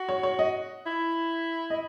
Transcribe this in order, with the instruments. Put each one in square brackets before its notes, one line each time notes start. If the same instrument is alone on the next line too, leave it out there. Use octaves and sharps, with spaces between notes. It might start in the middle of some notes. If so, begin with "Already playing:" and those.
Already playing: [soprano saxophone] F#4
[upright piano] C#5
C#5
D#5
[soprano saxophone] E4
[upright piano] D#5